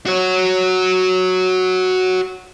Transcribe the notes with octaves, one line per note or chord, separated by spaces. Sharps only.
F#4 C#5